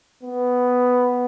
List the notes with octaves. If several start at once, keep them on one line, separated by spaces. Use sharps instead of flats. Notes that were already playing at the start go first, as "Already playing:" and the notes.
B3